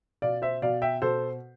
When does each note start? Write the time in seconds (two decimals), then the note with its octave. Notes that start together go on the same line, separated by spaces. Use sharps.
0.22 B2 D5 F5
0.42 C5 E5
0.62 B2 D5 F5
0.82 E5 G5
1.02 B2 A4 C5